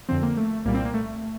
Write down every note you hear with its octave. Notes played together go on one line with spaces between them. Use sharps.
F2 D3 F3 C4
A#3
A3
C2 A#2 G3 A#3
C4
A#3
A3